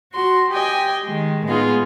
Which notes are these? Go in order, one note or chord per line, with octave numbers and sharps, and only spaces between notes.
F#4 C6
G4 D#5 G5 G#5
D#3 G#3
A2 G#3 B3 D#4 F4 G#4